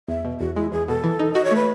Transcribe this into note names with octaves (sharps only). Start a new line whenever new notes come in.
E2 E5
B2
E2 F#4
G#3 E4
E2 G#4
B2 A4
E3
D#4
F#4 D#5
C#5
A3 B4